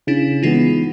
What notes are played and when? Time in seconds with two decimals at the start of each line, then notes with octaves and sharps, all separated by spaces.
0.07 C#3 D4 E4
0.43 E3 G#3 B3 D#4 F4